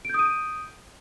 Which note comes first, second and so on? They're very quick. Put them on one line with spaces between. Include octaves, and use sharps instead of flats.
D7 G6 D#6 D#7